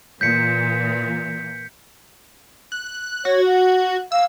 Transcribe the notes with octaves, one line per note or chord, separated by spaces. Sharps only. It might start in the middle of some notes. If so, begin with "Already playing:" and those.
A#2 E3 G6 B6 C#7
F#6
F#4 C#5
F#5
F5 E6